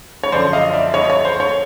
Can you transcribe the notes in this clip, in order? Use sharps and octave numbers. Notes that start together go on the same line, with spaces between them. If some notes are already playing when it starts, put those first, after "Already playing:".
C#5
F#2 D3 F3 C5 D5
D#5 F5
D5 E5
C#5 D#5
C#5
C5
C#5